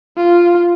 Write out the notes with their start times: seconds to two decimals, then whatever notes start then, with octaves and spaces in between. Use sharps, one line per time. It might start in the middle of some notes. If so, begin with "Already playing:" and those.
0.17 F4